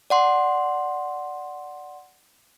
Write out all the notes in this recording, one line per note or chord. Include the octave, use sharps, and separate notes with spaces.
D5 F#5 C6